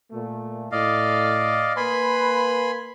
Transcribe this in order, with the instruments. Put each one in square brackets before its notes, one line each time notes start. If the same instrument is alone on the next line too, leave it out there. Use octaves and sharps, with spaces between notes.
[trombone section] A#2 A3
[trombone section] A2 [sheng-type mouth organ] D5 D#5 F5
[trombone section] A#3 B4 [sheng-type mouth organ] G#5 B5 C6